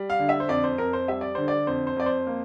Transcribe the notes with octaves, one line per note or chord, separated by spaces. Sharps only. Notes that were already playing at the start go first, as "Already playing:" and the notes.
Already playing: G3
F5
D3
E5
C5
F2 D5
C5
F2 A#4
C5
G3 E5
D5
D3 C5
D5
F2 C5
C5
F2 D5
C5
A#3